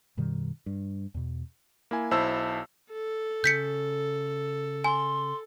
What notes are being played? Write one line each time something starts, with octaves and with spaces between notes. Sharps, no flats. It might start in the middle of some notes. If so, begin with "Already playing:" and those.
F#2 B2 D#3 G3
G2
E2 B2
A#3 E4 G#5
B1 E4 C5 A5 E6
A4
C#3 G6 B6 C#7
G#5 C6